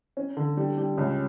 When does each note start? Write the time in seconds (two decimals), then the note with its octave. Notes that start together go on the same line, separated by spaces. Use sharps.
0.17 C#4
0.37 D3
0.56 G3 D4
0.78 G3
0.97 C#2 C#4